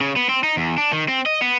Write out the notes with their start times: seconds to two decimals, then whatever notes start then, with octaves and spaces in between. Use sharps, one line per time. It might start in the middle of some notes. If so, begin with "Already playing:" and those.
0.01 C#3
0.16 B3
0.29 C4
0.43 D#4
0.57 E2
0.78 D4
0.93 D#3
1.08 C4
1.26 D#5
1.42 B3